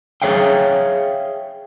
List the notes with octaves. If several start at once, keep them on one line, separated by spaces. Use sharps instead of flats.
G#4 A4 C#5 E5 F5 G5